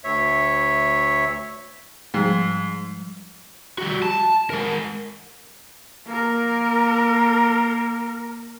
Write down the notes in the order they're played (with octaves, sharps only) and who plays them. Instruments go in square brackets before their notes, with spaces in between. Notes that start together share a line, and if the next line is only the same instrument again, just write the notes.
[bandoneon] D2 C#5 E5
[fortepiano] G#2 [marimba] F3 G3
[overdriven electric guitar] G3 F#4
A5
G#3 A#4
[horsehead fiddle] A#3 A#4